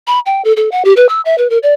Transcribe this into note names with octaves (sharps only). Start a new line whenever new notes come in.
B5
G5
A4
A4
F#5
G4
B4
E6
E5
B4
A#4
D5